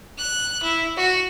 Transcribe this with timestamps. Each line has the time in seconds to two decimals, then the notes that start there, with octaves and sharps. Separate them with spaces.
0.18 F#6
0.63 E4
0.96 F#4